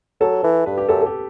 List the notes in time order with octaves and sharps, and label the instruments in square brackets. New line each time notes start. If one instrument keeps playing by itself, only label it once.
[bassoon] F#3 [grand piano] A4
[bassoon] E3 [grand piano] A4
[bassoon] G2 [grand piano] B4
[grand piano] G4
[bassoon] F#2 [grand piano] A4
[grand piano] A4
G4